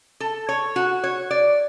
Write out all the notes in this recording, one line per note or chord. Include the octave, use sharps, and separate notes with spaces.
A4
C#5
F#4
C#5
D5